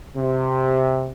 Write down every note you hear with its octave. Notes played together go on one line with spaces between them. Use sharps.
C3